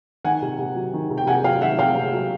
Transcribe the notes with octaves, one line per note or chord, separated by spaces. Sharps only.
D#3 F#5 G#5
C3
C3
F#3
D#3
C3
G5
C3 F#5 G#5
F#3 F5 G5
D#3 E5 F#5
C3 F5 G5
C3
F#3